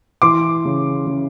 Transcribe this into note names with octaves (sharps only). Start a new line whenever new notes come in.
E3 C6 D6
C#3
C#3